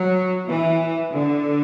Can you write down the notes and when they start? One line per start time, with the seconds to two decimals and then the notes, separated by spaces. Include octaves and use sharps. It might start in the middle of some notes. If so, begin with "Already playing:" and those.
Already playing: F#3
0.48 E3
1.14 D3